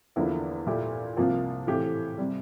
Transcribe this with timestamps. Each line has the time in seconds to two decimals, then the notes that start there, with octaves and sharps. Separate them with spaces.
0.16 E2 D3 F3 A#3 E4
0.66 A#2 A3 E4 G4
1.17 C2 C3 F3 A#3 F4
1.67 A2 E3 A3 C4 G4
2.18 C3 G3